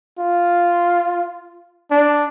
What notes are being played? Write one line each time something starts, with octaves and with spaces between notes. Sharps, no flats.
F4
D4